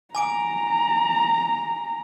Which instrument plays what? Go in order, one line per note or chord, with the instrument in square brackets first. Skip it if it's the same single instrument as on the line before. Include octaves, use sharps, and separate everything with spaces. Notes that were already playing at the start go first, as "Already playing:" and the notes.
[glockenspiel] G#5 D6 D7 [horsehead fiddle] A#5